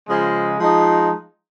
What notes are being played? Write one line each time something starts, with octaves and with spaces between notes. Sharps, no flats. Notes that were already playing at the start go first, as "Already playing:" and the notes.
C#3 F3 G#3
F3 G#3 D#4